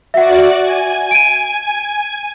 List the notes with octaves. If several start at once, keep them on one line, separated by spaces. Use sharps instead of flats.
F#4 D5 E5 F#5
G#5
D7 D#7